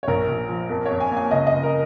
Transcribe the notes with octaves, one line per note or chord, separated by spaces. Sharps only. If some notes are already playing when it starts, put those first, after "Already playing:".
C#5
A#1 A#4
A#1
F3
F2 A#4
F2 C#5
G#5
A#3
G#5
C#2 D#5
D#5
C#2
A#4